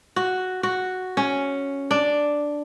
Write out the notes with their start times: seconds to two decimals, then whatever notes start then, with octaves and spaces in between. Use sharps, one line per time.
0.16 F#4
0.63 F#4
1.17 C#4
1.91 D4